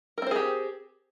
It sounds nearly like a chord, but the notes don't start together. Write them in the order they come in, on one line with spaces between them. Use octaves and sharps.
A#4 C4 C5 G#4 G4